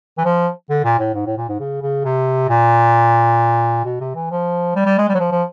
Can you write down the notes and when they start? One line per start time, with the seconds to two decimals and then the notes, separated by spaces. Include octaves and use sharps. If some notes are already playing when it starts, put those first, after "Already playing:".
0.18 E3
0.25 F3
0.70 D3
0.84 A#2
0.99 A2
1.15 G#2
1.26 A2
1.37 A#2
1.49 G#2
1.60 C#3
1.82 C#3
2.05 C3
2.49 A#2
3.85 B2
4.01 C3
4.15 E3
4.31 F3
4.76 G3
4.86 G3
4.98 G#3
5.09 G3
5.15 F#3
5.20 F3
5.32 F3